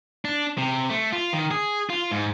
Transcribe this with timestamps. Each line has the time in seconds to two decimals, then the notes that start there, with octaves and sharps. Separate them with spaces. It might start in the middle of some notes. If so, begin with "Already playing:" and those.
0.25 D4
0.58 C3
0.90 A3
1.12 F4
1.33 D#3
1.51 G#4
1.90 F4
2.11 G#2